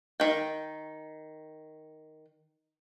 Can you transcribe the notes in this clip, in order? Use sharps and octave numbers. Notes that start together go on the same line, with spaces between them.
D#3 G5